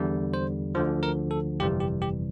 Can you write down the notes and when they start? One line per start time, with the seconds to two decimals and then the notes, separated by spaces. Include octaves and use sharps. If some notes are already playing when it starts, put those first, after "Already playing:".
Already playing: E2 D3 G3
0.34 C5
0.75 D2 D3 F3 C5
1.03 A#4
1.31 A4
1.60 G1 F2 C3 E3 G3 G4
1.80 G4
2.02 G4